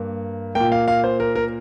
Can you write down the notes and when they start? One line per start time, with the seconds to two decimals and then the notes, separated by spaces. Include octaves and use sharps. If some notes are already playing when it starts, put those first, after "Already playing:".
Already playing: G2 A#3
0.55 A#2 A#3 G5
0.72 F5
0.88 F5
1.04 C5
1.20 A#4
1.35 A#4